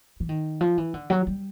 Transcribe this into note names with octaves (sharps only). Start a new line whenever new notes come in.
E3
D#3
F3
E3
D3
F#3
G3